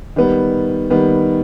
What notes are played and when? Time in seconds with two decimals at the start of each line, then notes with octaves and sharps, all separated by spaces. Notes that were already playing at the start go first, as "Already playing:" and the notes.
0.16 D#3 G3 B3
0.90 D#3 G3 B3